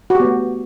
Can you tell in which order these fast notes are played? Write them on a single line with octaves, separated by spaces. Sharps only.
F#4 G4 B3 A3